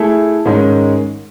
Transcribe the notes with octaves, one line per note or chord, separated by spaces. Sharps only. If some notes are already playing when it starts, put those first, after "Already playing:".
Already playing: A3 E4 G#4
G#2 D#3 G#3 C#4